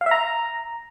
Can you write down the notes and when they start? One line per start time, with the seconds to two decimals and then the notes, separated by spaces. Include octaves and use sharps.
0.01 F5
0.06 E5
0.11 A#5